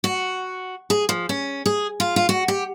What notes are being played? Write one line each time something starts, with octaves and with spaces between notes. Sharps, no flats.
F#4
G#4
F3
C#4
G#4
F4
F4
F#4
G4